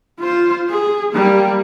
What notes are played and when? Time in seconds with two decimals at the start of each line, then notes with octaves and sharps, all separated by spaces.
0.20 F4 C5
0.69 G#4
1.13 G3 A#3